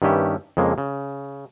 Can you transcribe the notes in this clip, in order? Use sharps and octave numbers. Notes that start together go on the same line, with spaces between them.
G2 D#3 B3 C#4 G4 E5
F2 C#3 G#3 A#3
C#3